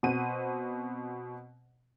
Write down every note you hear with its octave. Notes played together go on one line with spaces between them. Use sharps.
B2 C4 C5 F#5 D#7